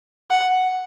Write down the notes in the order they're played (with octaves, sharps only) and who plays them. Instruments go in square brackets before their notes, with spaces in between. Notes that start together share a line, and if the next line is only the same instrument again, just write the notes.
[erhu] F#5